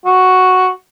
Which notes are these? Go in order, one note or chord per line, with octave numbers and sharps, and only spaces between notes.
F#4